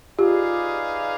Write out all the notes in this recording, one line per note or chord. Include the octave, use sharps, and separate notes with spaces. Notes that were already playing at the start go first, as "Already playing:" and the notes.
D#4 F4 G4 G#4 B4 D5 F5